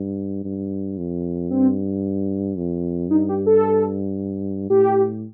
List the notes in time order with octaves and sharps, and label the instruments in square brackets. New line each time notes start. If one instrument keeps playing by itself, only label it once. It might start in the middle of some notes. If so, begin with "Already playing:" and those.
Already playing: [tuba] G2
G2
F2
[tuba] G2 [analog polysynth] C4
[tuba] F2
[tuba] G2 [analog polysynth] D#4
[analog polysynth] G4
A4
[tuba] A2 [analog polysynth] G4